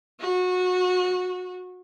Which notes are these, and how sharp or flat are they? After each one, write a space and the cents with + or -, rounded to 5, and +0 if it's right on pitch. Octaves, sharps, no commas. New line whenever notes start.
F#4 -25